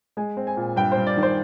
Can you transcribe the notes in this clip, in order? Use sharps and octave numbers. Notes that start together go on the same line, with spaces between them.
G#3 G#5
C4
G#5
A#2
G2 G5
C5
G2
D5
D#3
C5